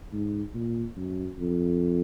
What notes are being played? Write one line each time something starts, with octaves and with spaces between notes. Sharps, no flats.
G#2
A#2
F#2
F2